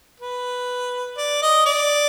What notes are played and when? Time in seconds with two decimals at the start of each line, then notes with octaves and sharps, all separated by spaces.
0.20 B4
1.17 D5
1.42 D#5
1.66 D5